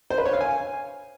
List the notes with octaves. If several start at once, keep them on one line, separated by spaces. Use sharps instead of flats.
C5
B4
C#5
F5
G#5